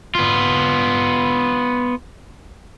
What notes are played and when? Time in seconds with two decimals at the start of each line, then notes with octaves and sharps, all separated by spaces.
0.15 B3 F4